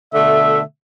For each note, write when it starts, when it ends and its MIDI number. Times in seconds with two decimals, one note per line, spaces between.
0.13 0.61 47
0.13 0.61 50
0.13 0.61 57
0.13 0.60 76